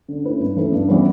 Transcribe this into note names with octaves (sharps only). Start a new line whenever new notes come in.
D3
A3 C#4 E4 B4
G2
E3 A3 E4 B4
G2
E3 G3 B3